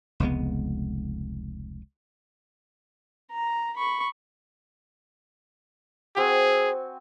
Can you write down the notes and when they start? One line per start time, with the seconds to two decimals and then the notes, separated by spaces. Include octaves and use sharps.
0.20 F1 C#2 G#3 B3
3.32 A#5
3.77 B5 C#6
6.16 C4 F#4 G#4 G#5